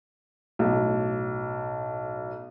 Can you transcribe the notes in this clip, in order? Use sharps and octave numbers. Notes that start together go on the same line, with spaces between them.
B1 A2